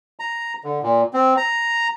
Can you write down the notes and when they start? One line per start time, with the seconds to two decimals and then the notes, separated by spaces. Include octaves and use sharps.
0.20 A#5
0.64 D3
0.82 A#2
1.13 C4
1.37 A#5